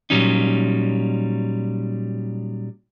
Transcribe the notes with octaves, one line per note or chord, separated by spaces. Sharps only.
A#2 F#3 G3 C#4 D#4